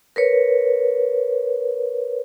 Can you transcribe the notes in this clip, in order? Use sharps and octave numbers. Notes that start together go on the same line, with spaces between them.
A#4 B4 C#5